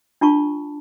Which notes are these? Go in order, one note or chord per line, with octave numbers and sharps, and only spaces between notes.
D4 F4 A5 C#6